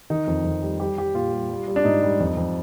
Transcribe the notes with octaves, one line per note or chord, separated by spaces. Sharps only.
D#3 D#4
F2
F2
G3
G3 G4
G3 G4
A#2 F4
G3
G3
G3
D4
G#2 D#4
G3
F2
F2